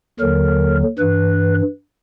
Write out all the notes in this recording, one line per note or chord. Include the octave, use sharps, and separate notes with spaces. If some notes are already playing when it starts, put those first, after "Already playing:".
D#2 D3 F#3 A#4
G2 E3 B4